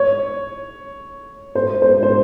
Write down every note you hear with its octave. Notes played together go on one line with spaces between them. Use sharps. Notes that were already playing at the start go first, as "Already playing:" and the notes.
Already playing: C#5
C5
C5
C5